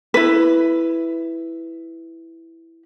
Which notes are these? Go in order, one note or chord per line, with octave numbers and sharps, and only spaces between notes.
E4 B4